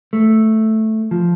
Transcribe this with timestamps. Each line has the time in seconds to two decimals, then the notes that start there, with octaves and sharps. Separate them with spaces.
0.13 A3
1.11 F3